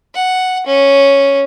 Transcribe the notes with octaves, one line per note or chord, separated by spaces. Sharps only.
F#5
C#4